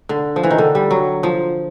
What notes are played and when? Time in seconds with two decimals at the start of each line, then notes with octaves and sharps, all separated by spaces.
0.09 D3
0.36 F3
0.43 E3
0.51 D#3
0.58 D3
0.75 G3
0.91 F#3
1.23 F3